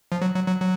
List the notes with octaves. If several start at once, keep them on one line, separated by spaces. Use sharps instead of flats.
F3
F#3
F#3
F#3
F#3